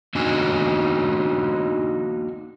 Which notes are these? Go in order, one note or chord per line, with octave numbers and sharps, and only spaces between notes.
A#3 D4 D#4 F#4 G#5